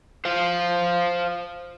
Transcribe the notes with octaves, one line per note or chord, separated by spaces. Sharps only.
C5 F5